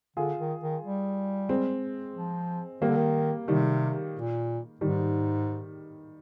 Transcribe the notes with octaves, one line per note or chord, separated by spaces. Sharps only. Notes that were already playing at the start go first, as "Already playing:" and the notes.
D3 F4 G#4
D#3
D#3
G3
G#3 C4
F3
D#3 G3 A#3
D3
D#3
C3 D#3 G3
A#2
G#2 D#3 G3